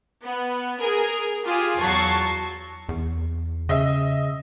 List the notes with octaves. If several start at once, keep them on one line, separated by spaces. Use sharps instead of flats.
B3
G#4 A#4
F4 G4 G#4
E2 F#3 A5 C#6 C7
E2
C#3 D#5 E5